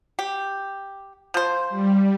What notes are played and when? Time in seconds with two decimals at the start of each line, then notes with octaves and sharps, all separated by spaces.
0.19 G4
1.34 F3 C5
1.69 G3